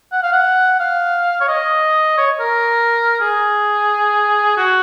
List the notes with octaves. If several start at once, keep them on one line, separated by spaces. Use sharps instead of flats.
F#5
F5
F#5
F5
C#5
D#5
C#5
A#4
G#4
F#4